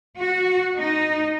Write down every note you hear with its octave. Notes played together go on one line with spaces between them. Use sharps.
F#4
D#4